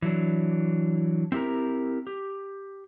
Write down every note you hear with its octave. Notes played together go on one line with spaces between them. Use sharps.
E3 F#3 D4
C4 E4 G4 A#4 A#5
G4